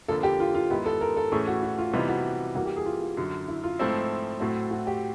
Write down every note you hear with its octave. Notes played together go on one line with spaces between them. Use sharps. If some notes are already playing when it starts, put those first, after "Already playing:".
F2 D3 F3 A#3 A4
G4
F4
F4
G#2 D#3 G#3 B3 E4 G4
A4
A#4
A4
A2 E3 A3 C#4 G#4
F#4
F#4
F4
C3 E3 G3 B3 D#4 F4
F#4
E3 G3 A#3 F#4
G4
G#4
F4
F4
F#2 D3 F#3
E4
F4
G#2 F3 A3 C4 E4
A2 F#3 A3 C4 F#4
F#4
G4